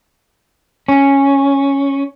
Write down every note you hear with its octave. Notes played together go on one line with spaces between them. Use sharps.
C#4